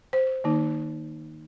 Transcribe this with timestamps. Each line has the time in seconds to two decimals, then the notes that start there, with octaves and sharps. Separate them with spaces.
0.13 C5
0.44 D#3 A#3 D#4